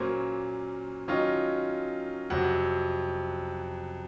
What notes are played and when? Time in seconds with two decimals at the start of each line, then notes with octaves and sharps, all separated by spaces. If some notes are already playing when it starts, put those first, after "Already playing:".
Already playing: A#2 F#3 A#3 C#4 C5
1.08 D#3 F#3 C#4 F4 D#5
2.30 F2 C3 F#3 F#5